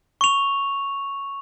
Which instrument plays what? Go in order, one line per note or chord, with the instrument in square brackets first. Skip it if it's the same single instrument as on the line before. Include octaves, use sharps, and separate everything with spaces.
[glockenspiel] C#6 F7